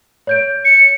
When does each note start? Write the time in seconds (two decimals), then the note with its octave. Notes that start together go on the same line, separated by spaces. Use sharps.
0.27 C#5 G6 D7
0.65 C#7